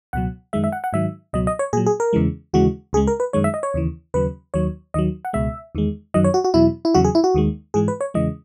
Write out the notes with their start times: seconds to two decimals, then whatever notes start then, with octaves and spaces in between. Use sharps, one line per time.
0.13 C#2 B2 F#3 F#5
0.53 F#2 D#3 G#3 E5
0.64 E5
0.72 F#5
0.84 F#5
0.93 G#2 D#3 F#3 E5
1.33 C#2 B2 F#3 D#5
1.47 D#5
1.59 C#5
1.73 A#2 F#3 G#4
1.86 G#4
2.00 A#4
2.13 E2 C#3 E3 G#3
2.53 D#2 C#3 E3 G#3 F#4
2.93 C#2 C#3 G#3 G#4
3.07 A#4
3.20 B4
3.33 F#2 D#3 G#3 C#5
3.44 E5
3.54 D#5
3.63 C#5
3.74 D#2 C#3 E3
4.14 D#2 C#3 F#3 B4
4.54 D#2 D#3 F#3 C#5
4.94 D#2 D#3 F#3 D#5
5.25 F#5
5.33 C#2 B2 G#3 E5
5.75 E2 D#3 G#3
6.14 F#2 D#3 F#3 D#5
6.24 C#5
6.34 F#4
6.44 F#4
6.54 E2 B2 F#3 E4
6.85 E4
6.94 E2 C#3 F#3 F#4
7.04 G#4
7.15 E4
7.24 F#4
7.35 D#2 D#3 G#3
7.74 G#2 E3 G#3 G#4
7.88 B4
8.01 C#5
8.14 E2 C#3 E3 G#3 D#5